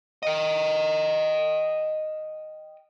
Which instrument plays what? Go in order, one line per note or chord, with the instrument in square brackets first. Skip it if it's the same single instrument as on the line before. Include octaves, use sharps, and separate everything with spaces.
[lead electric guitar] D#5 G5